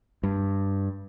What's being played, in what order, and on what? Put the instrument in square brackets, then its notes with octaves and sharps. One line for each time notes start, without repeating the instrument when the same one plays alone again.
[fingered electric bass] G2